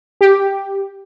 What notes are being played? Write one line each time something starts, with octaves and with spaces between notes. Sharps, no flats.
G4